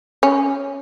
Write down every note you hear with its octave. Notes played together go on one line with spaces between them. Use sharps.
C#4